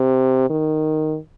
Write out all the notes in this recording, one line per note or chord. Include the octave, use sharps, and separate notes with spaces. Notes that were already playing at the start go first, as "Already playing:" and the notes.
Already playing: C3
D#3